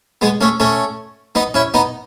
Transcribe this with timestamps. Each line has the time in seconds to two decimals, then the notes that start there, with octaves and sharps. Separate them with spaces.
0.21 G#3 B3
0.41 A3 C#4
0.60 A3 C#4
1.35 B3 D#4
1.54 C#4 E4
1.74 B3 D#4